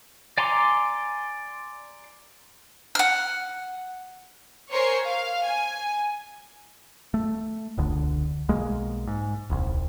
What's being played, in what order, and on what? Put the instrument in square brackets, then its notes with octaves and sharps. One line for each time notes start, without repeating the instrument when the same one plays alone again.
[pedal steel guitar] D5 G#5 A#5 C6 D6
[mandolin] F#5 F6
[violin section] A#4 C5 C#5 G#5 C#6 C7
F5
G#5
[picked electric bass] A3
E1 C#2 D3
B1 G#3 A#3
G#2
D#1 C2